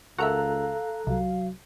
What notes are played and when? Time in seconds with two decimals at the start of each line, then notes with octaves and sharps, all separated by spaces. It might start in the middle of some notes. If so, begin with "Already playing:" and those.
0.18 C#2 F#4 A4 A#4 E5 F5 A#5 F#6
1.07 C2 F#3 F5